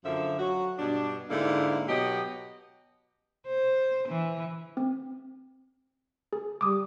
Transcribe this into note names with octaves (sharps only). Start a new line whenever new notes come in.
F#2 D3 F3 F4 E5
F#3 F#4
G2 B2 D4
G#2 D3 A#3 E4 D5
B2 F#3 G4 D#5
C5
E3
C4
G#4
G3 D6 D#6